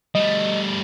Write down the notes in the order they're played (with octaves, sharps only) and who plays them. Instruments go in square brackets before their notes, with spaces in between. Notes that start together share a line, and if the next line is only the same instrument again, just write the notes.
[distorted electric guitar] G3 A3 [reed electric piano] D#5